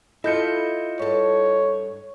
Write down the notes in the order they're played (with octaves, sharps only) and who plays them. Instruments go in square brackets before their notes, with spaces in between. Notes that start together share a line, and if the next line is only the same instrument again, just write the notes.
[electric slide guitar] E4 F4 [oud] A4 [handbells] D#5 G6 C#7
[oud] G2 A4 [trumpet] C#5